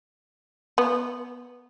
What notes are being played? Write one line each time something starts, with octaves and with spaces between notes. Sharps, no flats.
B3